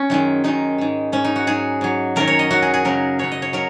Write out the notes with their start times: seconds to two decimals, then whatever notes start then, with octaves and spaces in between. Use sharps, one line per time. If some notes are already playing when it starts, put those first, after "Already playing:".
Already playing: C#4
0.10 F#2 D#3 G#3
0.44 F#2 D#3 G#3 D#4
0.78 G#2 G#3
1.12 G#2 G#3 C#4
1.24 D#4
1.36 F#4
1.47 G#2 F#3 G#4
1.81 G#2 F#3
2.16 F#2 D#3 F#3 A#4
2.27 C#5
2.39 D#5
2.50 F#2 D#3 F#3 F#4
2.62 G#4
2.74 G#4
2.85 F#2 C#3 F#3 A#4
3.19 F#2 C#3 F#3 C#5
3.32 D#5
3.42 C#5
3.53 F#3 A#4